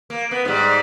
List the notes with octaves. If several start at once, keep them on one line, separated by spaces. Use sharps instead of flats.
A#3
B3
G#2 G3